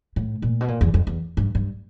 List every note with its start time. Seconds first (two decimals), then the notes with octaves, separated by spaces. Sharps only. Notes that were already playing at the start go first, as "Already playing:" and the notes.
0.16 A2
0.42 A#2
0.61 B2
0.68 A#2
0.81 E2
0.94 F2
1.07 E2
1.37 G2
1.55 G2